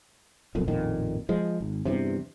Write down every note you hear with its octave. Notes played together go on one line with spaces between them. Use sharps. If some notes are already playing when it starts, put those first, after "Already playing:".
B1 F2 A#2
A1 F2 A#2 D#3
F3 G#3
G#1
E2 G2 C3